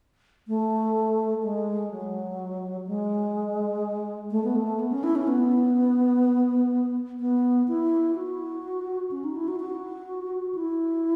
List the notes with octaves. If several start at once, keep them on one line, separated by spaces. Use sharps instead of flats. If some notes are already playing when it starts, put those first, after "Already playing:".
A3
G#3
F#3
G#3
A3
B3
A3
B3
C#4
E4
C#4
B3
B3
E4
F#4
C#4
D#4
E4
F#4
F#4
E4